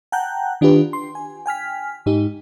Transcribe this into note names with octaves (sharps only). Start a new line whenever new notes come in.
F#5 G5 A5 A#5 F#6 G6
D#3 D4 F4 G4 B4
C6
G#5
G5 G#5 F6 B6
G#2 D#4 G4